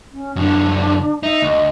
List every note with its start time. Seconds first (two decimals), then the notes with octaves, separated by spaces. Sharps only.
0.12 C#4
0.36 F#2 D3 D4
1.23 D#4 E5
1.42 D2 D#5